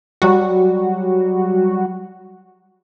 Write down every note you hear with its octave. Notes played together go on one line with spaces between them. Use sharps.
F#3 G3 F#4